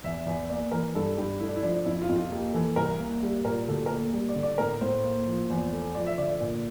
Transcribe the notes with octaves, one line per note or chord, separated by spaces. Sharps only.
E2 E5
E2
A#3 D5
E3 A#4
G2 A4
G2 G4
A3 E4
D4
E4
F3 D4
F2 E4
F4
F2
F4
A#3 G4
E3 A4
C2 A#4
A#3
G3
A#2 A#4
D2 A4
A#4
A#3 A4
G3
D5
D3
D5
A2 A#4
A2 C5
A#3
F3
E2
A3
F3 D5
E5
D3 D5
D5
A#2 D5